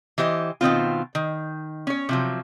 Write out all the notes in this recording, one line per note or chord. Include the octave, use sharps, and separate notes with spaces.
E3 G4 C5 D#5
B2 D#3 C4 F4
D#3
C#4 C#5
C3 F3 F#3